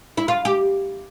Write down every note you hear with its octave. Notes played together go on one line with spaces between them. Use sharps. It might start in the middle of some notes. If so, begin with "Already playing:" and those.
E4
F4
G4